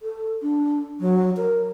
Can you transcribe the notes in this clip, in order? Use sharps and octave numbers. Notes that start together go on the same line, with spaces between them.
A4
D4
F#3
A#4